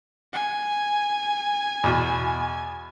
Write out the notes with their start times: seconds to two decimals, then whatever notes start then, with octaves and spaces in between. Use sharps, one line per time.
0.33 G#5
1.84 E2 B2